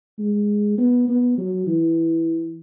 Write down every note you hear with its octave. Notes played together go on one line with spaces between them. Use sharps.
G#3
B3
B3
F#3
E3